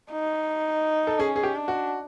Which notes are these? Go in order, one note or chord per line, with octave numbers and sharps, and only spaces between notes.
D#4
A4
C#4 G#4
G#4
G4
D4
F#4